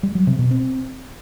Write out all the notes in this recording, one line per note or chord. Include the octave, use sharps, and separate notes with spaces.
G3
F#3
C3
B2
C4